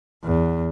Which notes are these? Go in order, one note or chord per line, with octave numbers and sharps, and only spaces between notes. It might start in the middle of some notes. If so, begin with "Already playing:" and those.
E2